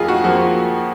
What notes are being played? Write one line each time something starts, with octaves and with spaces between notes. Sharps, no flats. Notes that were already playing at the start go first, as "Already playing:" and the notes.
Already playing: F2 F3 A#3 F4 G#4 D#5
F#4
F2 F3 A#3 F#4